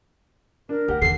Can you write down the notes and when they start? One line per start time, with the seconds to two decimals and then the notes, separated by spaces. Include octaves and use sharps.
0.69 D4 A#4
0.88 D2 G4 F#5
1.02 D#2 D3 A4 C7